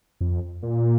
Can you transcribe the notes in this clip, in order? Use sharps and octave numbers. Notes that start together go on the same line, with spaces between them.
F2
A#2